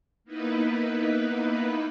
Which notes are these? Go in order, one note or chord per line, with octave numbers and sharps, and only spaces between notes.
A#3 B3 D#4 E4 B4